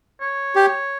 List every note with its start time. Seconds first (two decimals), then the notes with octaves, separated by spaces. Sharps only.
0.21 C#5
0.56 G4